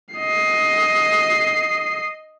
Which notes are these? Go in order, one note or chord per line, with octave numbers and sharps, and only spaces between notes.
D#5 C7